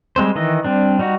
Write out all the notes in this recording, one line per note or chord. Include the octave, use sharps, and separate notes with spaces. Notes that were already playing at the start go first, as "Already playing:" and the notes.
G3 G#3 C4 C5
D#3 E3 D#5
G3 C4 D4
G3 D#4 F#4